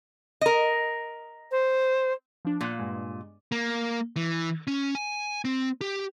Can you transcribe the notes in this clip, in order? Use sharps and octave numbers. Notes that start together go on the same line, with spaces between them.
A#4 D#5
C5
F3 D4
A#2 F5 F#5 F#6
G2 G#3
A#3
E3
C#4
G#5
C4
G4